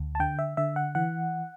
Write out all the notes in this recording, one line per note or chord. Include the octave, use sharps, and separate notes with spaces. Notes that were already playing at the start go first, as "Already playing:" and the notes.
Already playing: D2
A5
D3 G5
E5
D3 E5
F#5
E3 F#5